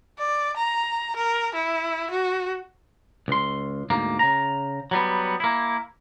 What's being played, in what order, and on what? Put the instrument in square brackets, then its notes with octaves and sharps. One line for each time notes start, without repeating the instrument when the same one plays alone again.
[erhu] D5
A#5
A#4
E4
F#4
[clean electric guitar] C#2 C6
D2 G#2 A#3
C#3 A#5
F#3 G3 B3
A#3 E4